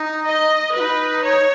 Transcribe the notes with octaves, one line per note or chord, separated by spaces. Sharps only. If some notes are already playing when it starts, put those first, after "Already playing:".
Already playing: D#4
D#5
D#4 F#4 B4
C#5